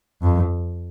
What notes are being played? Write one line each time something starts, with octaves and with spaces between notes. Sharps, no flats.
F2